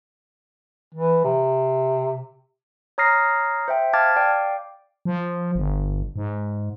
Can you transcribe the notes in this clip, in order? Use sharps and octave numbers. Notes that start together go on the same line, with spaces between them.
E3
C3
C#5 A#5 D#6 F6 A#6 C7
C5 E5 G5
F5 A5 D6 F6 G#6 A6
D5 F5 G5 D6
F3
G1
G#2